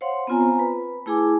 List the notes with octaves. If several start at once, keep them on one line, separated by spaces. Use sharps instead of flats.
C5 C#5 F5 F#5 C6
B3 C4 F4 G#5 A#5
C5 A#5
B4 B5
A3 E4 G#4 G#5 D6